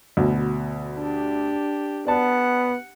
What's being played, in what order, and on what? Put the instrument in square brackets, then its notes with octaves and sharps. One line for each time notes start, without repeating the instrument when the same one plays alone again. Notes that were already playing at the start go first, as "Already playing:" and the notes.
[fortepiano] D2 B2
[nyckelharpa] D4 G4
[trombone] B3 [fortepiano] D5 A5 [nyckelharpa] F#5